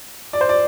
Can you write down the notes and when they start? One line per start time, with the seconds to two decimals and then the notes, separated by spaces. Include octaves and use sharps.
0.33 D5
0.41 C5
0.49 D5